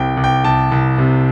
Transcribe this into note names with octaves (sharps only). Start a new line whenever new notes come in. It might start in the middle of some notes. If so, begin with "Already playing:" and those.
Already playing: C2 C3 G5
C2
G5
C2 A5
C2
C3